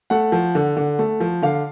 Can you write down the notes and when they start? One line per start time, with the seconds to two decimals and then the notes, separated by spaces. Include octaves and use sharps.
0.10 A3 F#5
0.32 F3
0.55 D3
0.77 D3
0.99 A3
1.20 F3
1.42 D3 F5